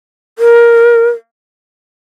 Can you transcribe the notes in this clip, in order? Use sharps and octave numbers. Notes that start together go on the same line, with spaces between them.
A#4